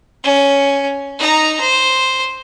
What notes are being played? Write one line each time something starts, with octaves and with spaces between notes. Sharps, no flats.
C#4
D#4 A#5
C5